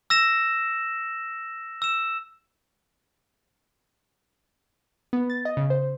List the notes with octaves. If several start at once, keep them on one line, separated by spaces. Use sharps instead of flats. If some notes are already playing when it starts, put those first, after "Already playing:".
E6 A#6 E7
E6 E7
B3
A6
D#5
C#3
C5